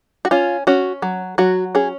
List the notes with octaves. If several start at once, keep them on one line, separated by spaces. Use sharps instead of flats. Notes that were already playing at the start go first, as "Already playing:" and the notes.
F#4
C#4 F4
C#4 F#4
F#3
F#3 F#4
C#4 G#4